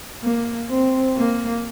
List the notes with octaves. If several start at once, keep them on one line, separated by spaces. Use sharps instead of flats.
A#3
C4
A#3